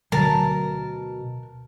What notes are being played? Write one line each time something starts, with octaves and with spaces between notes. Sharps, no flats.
D2 B2 D3 F#3 A#4 A5